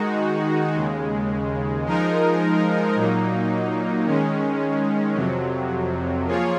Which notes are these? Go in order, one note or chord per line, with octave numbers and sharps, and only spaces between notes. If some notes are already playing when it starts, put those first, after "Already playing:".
Already playing: D#3 G#3 D#4 F#4
D#2 C#3 G#3
F3 G#3 D#4 A#4
A#2 F#3 A#3 D#4
D#3 G#3 C#4
F2 C3 F#3
F3 A#3 F4 G#4 C#5